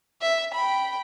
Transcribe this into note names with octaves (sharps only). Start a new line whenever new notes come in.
E5
G5 B5